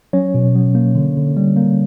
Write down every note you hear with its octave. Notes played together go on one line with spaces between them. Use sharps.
F#3 C#4 C#5
B2
F#3
A#3
D3
D3
G3
A#3